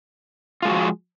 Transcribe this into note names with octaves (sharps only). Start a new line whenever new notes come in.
F3 G#3 F4 F#4 G#4